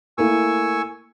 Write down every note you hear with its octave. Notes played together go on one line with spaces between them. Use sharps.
A3 A#3 E4 G#5 C#6 E6